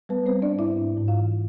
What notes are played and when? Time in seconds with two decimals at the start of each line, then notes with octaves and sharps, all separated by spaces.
0.09 G3 B3 B4
0.26 C4 C5
0.31 G3
0.42 D4 D5
0.53 G#2
0.59 E4 E5
0.75 G#2
0.97 G#2
1.08 F4 F5
1.19 E3